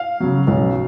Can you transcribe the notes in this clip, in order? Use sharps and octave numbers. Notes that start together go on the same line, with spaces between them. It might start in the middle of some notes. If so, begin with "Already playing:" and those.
Already playing: F5
C#3 F#3
B1